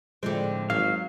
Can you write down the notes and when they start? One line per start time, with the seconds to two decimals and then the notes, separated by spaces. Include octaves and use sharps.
0.23 A2 D3 F3 G#3 C4
0.70 G#1 F#3 F5